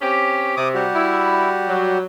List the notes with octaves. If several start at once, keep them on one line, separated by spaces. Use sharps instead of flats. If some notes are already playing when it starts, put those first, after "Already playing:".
C4 C#4 G4
C3 D6 D#6
G3 F#4 G4
E4
F#3